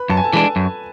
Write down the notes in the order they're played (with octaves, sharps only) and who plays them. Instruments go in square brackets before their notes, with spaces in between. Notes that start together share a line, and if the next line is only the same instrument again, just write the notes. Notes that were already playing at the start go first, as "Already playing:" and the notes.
Already playing: [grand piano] B4 B5
[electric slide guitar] F#2 [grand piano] A5
[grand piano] G#5
A4 A5
[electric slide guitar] E3 G#3 D4
F#2